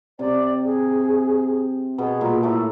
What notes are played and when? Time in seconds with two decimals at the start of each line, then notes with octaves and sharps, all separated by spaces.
0.19 C3 C4 D5
0.64 G#4
1.98 B2 B3 G#4
2.21 A#2 A#3
2.43 A2 A3 A4